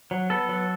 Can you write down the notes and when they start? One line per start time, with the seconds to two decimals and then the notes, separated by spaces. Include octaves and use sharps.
0.11 F#3
0.30 B3 A4
0.49 F#3